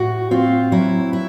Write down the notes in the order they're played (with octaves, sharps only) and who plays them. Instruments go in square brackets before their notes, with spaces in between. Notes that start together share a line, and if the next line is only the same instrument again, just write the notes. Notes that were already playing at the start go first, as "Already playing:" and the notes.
Already playing: [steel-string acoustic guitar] A2 F#4
C4 F4
F#3 E4
E4